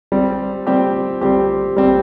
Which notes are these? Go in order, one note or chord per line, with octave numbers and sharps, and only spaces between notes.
G3 C4 G4
G3 C4 G4
G3 C4 G4
G3 C4 G4